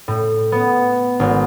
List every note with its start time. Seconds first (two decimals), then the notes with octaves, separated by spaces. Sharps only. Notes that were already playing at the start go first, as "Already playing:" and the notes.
0.08 A2
0.52 B3
1.20 G#1